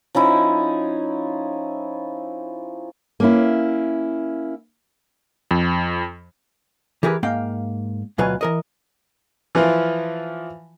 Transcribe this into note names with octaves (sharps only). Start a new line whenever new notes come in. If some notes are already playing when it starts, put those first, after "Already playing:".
F3 C#4 D#4 E4
A#3 C#4 E4
F2
E3 G4 G#4 A#4 B4
G#2 A#3 F5 G5
D2 B2 F#3 F4 B4 G#5
E3 A#4 D#5
E3 F3 E4 F4